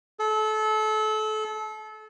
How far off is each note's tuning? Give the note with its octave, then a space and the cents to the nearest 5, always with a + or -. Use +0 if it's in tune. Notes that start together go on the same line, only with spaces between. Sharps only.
A4 -30